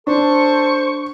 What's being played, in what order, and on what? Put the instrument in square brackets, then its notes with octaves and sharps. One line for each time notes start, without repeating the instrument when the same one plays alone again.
[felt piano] D4 [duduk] A4 [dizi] C5 [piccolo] C#6